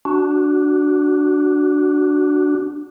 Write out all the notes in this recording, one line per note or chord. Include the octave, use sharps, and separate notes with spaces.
D4 F#4